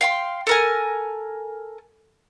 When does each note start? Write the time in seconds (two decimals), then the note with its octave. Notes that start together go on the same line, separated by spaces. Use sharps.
0.01 F5 G5 C6
0.47 A4 A#4 G#5